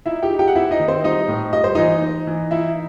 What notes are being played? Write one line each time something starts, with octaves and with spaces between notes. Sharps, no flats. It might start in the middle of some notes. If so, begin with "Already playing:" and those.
D#4 E4 E5
G4 G5
D#4
G4 G5
F#5
C4 E4 E5
D#4 D#5
D#3
C4 C5
G3 D#4 D#5
A2
G3 D#5
C5
E3 D#4 D#5
D#4
E3
D#4 E4 E5